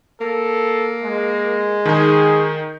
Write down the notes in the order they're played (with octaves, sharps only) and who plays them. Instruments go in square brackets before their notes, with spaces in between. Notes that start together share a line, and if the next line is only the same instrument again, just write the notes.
[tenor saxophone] A#3 [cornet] A4
[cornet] G#3
[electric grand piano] D#3 D#4 [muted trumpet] G#4